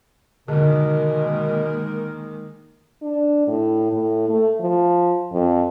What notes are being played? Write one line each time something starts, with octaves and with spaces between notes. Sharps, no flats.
B2 D3 D#3 G#3 A#3 A#4
D4
A2
A2
A3
F3
F2